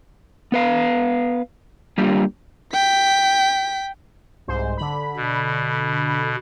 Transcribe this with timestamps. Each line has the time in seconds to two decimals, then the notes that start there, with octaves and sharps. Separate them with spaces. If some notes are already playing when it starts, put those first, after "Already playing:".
0.52 B3 B4 F5
1.98 G3 A#3 D4 F4 G4
2.73 G5 B6
4.48 C2 G#2 C5
4.78 D3 B5
5.16 B2